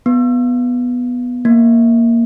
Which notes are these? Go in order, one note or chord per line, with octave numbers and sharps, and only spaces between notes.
B3
A#3